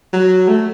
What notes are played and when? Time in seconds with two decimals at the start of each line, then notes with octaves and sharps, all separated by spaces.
0.13 F#3
0.48 A3